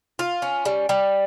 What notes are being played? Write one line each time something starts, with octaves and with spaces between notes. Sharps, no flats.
F4
C#4
G3
G3